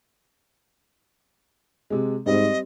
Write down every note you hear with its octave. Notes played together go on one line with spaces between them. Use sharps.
C3 G#3
G#2 G3 C4 D#5